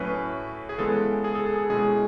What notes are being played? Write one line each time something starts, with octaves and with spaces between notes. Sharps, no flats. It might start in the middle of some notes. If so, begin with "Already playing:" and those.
Already playing: A2 F#3 A3 C#4 B4
G#4
C#3 E3 G#3 B3 A4
G#4
A4
G#4
A4
B2 G#3 C#4 E4 G#4